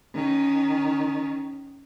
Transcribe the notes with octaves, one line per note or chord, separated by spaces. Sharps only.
D#3 C#4